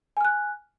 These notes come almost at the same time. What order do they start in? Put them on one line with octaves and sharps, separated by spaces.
G#5 F6 F#6